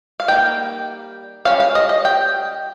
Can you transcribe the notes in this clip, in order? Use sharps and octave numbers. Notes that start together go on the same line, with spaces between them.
F5
G3 A#3 D#4 G5
G3 C#4 F5
F5
D#5
D#5
G5